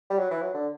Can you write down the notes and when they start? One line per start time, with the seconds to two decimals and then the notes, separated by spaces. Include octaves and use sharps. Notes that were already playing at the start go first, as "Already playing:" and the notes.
0.10 G3
0.19 F#3
0.30 E3
0.42 F#3
0.54 D3